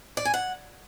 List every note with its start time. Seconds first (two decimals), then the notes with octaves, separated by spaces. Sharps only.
0.17 D5
0.25 G#5
0.34 F#5